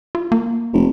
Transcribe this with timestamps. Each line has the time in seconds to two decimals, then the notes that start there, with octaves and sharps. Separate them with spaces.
0.15 F4
0.32 A#3
0.73 F1